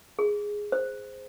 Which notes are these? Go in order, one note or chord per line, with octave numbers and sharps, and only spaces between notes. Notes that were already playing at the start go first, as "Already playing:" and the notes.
G#4
C5